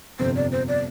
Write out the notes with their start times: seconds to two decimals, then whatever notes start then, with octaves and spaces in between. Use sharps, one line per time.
0.19 G1 F2 C3 C5
0.36 D5
0.52 C5
0.68 D5